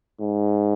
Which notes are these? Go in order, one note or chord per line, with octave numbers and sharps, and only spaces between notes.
G#2